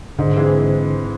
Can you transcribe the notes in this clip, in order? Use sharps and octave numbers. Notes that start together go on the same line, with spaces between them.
G#2 D3
E3 G#3 C4 E4